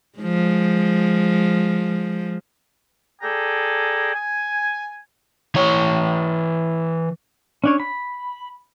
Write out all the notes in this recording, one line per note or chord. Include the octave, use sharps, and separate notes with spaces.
F3 G#3
G#4 A4 D5 G5 G#5 A#5
G#5
E3 C#5
C#4 D4 C#5
B5